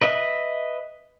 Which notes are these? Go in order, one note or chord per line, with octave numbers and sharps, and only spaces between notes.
B4 D#5 E5